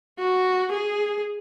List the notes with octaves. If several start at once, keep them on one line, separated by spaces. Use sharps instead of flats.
F#4
G#4